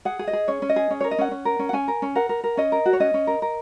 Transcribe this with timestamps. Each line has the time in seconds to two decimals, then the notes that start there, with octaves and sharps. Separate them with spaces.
0.05 G#4 F#5
0.19 G#4
0.28 D#5
0.33 G#4
0.48 C#4 C#5
0.62 C#4
0.69 D#5
0.76 G#4
0.90 C#4
1.01 A#4 C#5
1.11 D#5
1.18 C#4 F#5
1.31 C#4
1.45 A#4
1.59 C#4
1.69 F#5
1.73 C#4 G#5
1.88 A#4
2.02 C#4
2.15 A#4 F#5
2.29 A#4
2.44 A#4
2.57 C#4 D#5
2.72 A#4
2.86 F#4
2.93 C#5
3.00 C#4 D#5
3.14 C#4
3.27 A#4
3.42 A#4